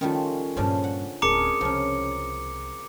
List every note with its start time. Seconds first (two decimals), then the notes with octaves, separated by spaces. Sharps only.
0.01 D#3 G3 A3 C#4 F4
0.57 G2 A#2 C#3 F3 D4
0.84 F#5
1.22 D1 C4 D4 G#4 A#4 A#5 D6 C#7
1.61 C2 C#3 F3